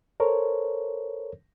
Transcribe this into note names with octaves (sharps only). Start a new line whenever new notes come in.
A4 A#4 C5 C#5